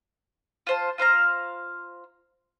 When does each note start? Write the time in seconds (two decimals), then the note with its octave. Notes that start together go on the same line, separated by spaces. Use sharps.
0.67 F4 C5 A5
0.98 F4 C5 F5 A#5